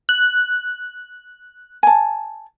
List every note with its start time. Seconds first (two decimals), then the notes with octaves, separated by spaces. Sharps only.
0.09 F#6
1.83 G#5 A5